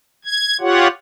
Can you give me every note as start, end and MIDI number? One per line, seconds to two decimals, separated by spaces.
0.25 0.57 92
0.61 0.88 65
0.61 0.88 67
0.61 0.88 73
0.61 0.88 78